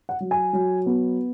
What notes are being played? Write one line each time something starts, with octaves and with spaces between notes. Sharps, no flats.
F#5
F#3
G#5
F#3
B3